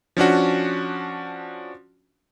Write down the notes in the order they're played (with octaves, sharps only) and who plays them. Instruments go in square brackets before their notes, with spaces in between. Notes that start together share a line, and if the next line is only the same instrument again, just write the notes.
[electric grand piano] F3 C#4 D4 F#4